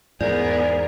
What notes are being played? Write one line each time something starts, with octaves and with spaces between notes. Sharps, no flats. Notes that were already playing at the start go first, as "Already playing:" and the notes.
E2 G#2 B3 G#4 A#4 D5